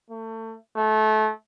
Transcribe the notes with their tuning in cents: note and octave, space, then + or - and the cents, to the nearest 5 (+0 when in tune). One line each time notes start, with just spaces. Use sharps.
A3 +30
A3 -25